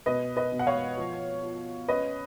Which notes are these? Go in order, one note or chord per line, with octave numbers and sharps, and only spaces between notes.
B2 B4 D#5
B4 D#5
B2
F#5
C#5 F5
F3
F3
C#4 B4 D#5